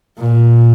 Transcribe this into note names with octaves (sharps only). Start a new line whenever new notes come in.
A#2